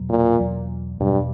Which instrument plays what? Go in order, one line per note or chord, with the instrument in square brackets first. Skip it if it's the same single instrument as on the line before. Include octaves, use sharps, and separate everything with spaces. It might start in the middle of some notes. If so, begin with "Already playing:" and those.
Already playing: [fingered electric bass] E2 B2 F#3
[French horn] A#2
[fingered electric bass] E2 B2 F#3
[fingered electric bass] E2 B2 F#3 [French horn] G2